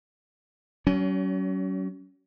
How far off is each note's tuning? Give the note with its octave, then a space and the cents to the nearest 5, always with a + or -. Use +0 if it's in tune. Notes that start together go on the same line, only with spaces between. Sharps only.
F#3 +40 C#4 +20